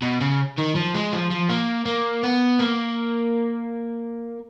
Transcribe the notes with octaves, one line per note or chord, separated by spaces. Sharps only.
B2
C#3
D#3
F3
G#3
F3
F3
A#3
A#3
B3
A#3